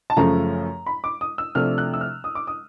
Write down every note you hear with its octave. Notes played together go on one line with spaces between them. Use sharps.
A5
F#2 C#3 F3 A3 A#5
B5
D6
D#6
E6
C3 F3 A3 D4 F6
F#6
E6
F6
D#6
D6
D#6